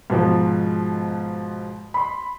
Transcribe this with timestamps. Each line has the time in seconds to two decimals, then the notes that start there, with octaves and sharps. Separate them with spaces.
0.10 G#2 B2 F3
1.94 B5 C6